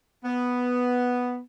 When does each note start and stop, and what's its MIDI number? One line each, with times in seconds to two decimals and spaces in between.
0.24 1.39 59